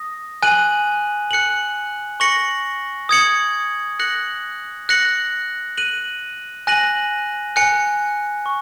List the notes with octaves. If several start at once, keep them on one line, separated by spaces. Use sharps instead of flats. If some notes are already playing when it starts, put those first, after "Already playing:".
Already playing: D#6 A#6
G#5 F#6 D#7 F#7
F#6 C#7 F#7
C#6 A#6 C#7 F#7
D#6 G#6 C#7 F#7
F#6 A#6 C#7 F#7
F#6 A#6 C#7 F#7
F#6 D#7 F#7
G#5 F#6 A#6 D#7 F#7
G#5 F#6 C#7
C#6